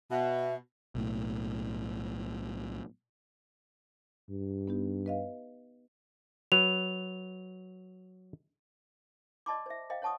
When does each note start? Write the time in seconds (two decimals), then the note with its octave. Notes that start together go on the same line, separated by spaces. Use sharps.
0.11 B2 E5
0.95 B1 A2
4.30 G2
4.68 B3 D#4 G4
5.06 B4 D#5 F5
6.52 F#3 B4 F7
9.46 D5 D#5 A5 C6 D6
9.66 C5 E5
9.90 C5 D#5 F5 G5
10.02 C#5 F#5 A5 C#6 D#6